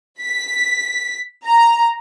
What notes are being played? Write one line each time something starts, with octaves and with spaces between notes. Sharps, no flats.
B6
A#5